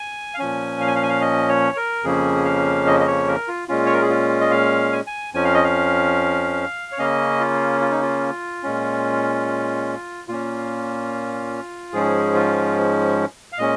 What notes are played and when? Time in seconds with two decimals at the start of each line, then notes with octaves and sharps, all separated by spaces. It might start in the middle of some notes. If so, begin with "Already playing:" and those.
Already playing: G#5
0.34 F5
0.38 A#2 F3 C#4 G#5
0.80 F5
0.87 G#5
0.95 F5
1.03 G#5
1.09 F5
1.21 D#5
1.49 C#5
1.77 A#4
2.04 F2 C#3 F3 A#3 C#4 G#4
2.45 F5
2.87 D#5
3.00 D#5
3.07 C#5
3.28 A#4
3.48 F4
3.68 A#2 G#3 C#4 F4
3.86 C#5
3.93 A#4
4.01 G#4
4.10 F4
4.41 D#5
4.51 F5
4.92 G#5
5.07 G#5
5.34 F2 F3 C#4 G#5
5.44 F5
5.54 D#5
5.64 F5
6.92 C#5
6.98 C#3 A#3 C#4 D#5
7.40 F4
7.81 F4
7.91 D#4
8.02 F4
8.63 A#2 G#3 C#4
10.28 A#2 A#3 C#4 F4
11.93 G#2 F3 G#3 C#4 G#4
12.34 F4
13.52 F5
13.58 A#2 G#3 C#4 D#5